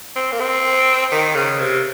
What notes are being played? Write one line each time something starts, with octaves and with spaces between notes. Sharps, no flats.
C4
A#3
C4
D#3
C#3
C3